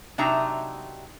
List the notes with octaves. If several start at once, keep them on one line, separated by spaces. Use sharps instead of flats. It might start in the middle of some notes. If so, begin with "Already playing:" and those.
C3 F#3 D4 D#4 E5 A#5